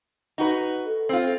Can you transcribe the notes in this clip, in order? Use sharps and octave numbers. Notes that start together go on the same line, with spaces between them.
D#4 F#4 B4
A4
C4 F4